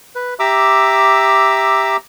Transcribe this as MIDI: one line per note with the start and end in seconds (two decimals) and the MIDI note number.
0.15 0.34 71
0.39 1.97 67
0.39 1.97 76
0.39 1.97 82
0.39 1.97 86
0.39 1.97 88